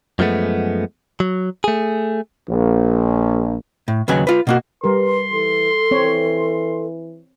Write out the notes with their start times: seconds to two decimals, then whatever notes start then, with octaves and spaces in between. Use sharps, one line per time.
0.19 F#2 F3 G#3 A3 B3
1.20 F#3
1.64 A3 G#4
2.49 A#1
3.88 A2
4.08 D#2 C#3 F#3 B4 G#5
4.27 F4 B4
4.47 B2 A#3 F#4
4.84 G3 G4 A#4 B4 C6
5.32 E3 A4
5.91 E3 C4 C#5